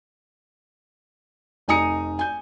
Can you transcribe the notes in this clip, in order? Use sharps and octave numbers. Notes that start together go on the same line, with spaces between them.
F1 D#4 G#5 A#5 D#6 C#7
G#5 G6